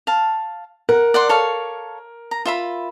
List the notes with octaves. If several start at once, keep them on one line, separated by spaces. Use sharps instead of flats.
F5 A5
A#4 F#5
D5 F#5 C6
A4 C#5 F5
A#5
F4 E5 B5